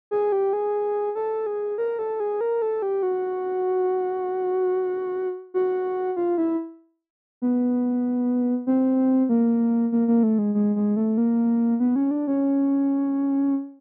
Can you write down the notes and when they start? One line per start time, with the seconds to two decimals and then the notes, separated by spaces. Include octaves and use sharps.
0.11 G#4
0.32 G4
0.53 G#4
1.15 A4
1.47 G#4
1.78 A#4
1.99 A4
2.20 G#4
2.41 A#4
2.62 A4
2.82 G4
3.03 F#4
5.54 F#4
6.17 F4
6.38 E4
7.42 B3
8.67 C4
9.29 A#3
9.92 A#3
10.08 A#3
10.23 A3
10.39 G#3
10.54 G#3
10.76 G#3
10.96 A3
11.18 A#3
11.80 B3
11.96 C#4
12.11 D4
12.27 C#4